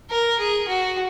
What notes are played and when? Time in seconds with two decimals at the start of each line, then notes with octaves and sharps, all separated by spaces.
0.11 A#4
0.39 G#4
0.68 F#4